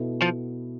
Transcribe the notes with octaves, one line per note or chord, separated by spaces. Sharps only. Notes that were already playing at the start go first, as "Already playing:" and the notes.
Already playing: B2 B3 E4 A4
F3